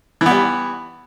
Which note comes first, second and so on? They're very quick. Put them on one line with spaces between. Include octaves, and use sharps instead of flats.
E3 B3 G3